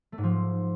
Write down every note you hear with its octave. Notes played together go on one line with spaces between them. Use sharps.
A3
G#2
F3